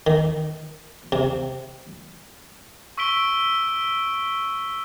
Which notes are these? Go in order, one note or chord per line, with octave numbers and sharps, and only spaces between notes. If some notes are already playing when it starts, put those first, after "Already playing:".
D#3
C3
C#6 E6 B6 D7 G7